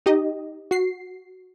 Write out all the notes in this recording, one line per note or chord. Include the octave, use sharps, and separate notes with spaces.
D#4 G4 D#5
F#4 C7